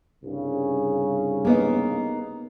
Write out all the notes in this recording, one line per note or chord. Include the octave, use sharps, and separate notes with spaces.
C2 G2 C#3
A#3 B3 D#4